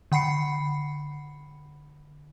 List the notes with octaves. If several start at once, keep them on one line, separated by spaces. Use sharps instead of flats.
D3 F#5 B5 C7 C#7